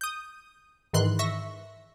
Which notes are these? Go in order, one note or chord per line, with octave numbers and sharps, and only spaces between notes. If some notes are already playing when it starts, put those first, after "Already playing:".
D#6 G6
G#2 D#3 E3 C6 F#6
E5 C#6 A#6